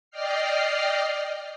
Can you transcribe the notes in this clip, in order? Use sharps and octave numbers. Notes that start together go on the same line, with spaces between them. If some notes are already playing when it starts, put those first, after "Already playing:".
D5 D#5 G5 F6 C7